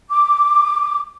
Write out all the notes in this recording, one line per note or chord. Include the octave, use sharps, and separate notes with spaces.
D6